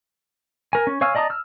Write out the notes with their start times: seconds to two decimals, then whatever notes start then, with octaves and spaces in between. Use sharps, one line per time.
0.73 A#4 G#5
0.87 C#4
1.01 C#5 F5 G#5 E6 F6
1.15 D5 D#5 A5 A#5 D#6
1.30 E6 F6